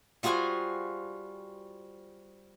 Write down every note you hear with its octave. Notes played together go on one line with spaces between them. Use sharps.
G3 F4 F#4 G#4 C5 G#5